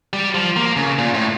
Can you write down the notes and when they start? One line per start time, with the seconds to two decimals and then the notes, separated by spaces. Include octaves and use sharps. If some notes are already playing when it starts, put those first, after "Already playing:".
0.13 G3
0.35 F3
0.56 A#3
0.76 C#3
0.99 A#2
1.14 A2